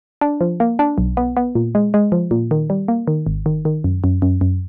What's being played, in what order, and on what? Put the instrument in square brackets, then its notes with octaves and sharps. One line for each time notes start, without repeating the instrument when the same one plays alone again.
[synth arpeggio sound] D4
F3
A#3
D4
B1
B3
B3
A#2
G#3
G#3
F3
A#2
D#3
G3
A#3
D#3
G#1
D#3
D#3
F#2
F#2
F#2
F#2